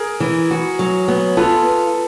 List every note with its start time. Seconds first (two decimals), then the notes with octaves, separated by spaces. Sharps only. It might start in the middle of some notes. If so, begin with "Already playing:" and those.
Already playing: G#4 A#4
0.20 E3
0.51 F#4
0.79 F#3
1.08 B3
1.37 F4 A4 B4